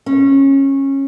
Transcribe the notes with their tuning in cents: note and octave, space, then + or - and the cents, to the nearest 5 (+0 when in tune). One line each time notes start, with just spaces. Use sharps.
C#4 -20